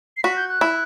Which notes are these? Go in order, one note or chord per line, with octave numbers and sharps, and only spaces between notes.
C7
F#4 B6
G6
F#6
E4